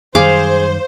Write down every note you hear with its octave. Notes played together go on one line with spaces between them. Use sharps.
F#2 D#3 G3 G#4 C5 F5 D6